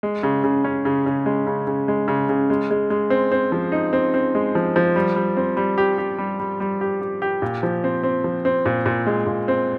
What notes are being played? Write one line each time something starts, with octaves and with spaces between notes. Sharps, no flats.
G#3
C#3
C#3
C#4
C#3
C#3
G#3
C#3
C#3
G#3
C#3
C#3
G#3
G#3
G#3
C4
C4
F3
D#4
C4
C4
G#3
F3
F3
G3
G3
C4
G3
G4
G4
G3
G3
G3
G4
G4
G4
A#2
F3
C4
C4
F3
C4
A#2
A#2
G#3
A#2
C4